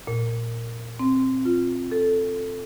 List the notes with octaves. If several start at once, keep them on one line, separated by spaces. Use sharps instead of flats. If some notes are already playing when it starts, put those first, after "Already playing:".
A#2
C4
F4
A4